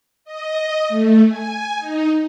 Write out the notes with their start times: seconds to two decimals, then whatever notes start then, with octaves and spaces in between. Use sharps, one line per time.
0.25 D#5
0.89 A3
1.26 G#5
1.78 D#4